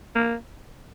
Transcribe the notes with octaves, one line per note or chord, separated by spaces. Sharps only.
A#3